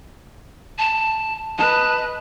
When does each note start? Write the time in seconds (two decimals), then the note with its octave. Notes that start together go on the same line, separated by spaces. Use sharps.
0.79 A5
1.58 B4 D#5 A5